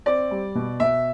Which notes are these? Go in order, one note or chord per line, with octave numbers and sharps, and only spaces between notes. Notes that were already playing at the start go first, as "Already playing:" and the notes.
C4 D5
G3
B2
B2 E5